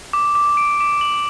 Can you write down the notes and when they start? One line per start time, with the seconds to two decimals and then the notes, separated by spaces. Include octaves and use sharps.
0.13 D6
0.35 D6
0.57 D7
0.80 D6
1.01 F#7